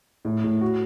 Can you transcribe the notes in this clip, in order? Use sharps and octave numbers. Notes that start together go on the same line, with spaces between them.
A2
A2
F#4